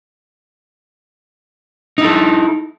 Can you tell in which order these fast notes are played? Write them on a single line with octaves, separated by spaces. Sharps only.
D#4 E4 A4